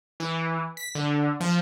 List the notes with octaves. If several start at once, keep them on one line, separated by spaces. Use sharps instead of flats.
E3
B6
D3
F3